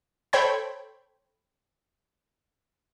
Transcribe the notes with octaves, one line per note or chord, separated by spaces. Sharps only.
A4 C5 C#5 G5 B5 G#6